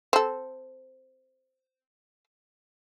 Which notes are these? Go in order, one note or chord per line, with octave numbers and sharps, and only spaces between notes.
C4 A4